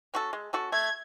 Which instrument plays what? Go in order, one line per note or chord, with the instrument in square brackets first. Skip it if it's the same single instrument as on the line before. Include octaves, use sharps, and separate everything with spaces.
[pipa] C#4 F#4 A4
G#3
C#4 F#4 A4
[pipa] A3 [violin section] G#6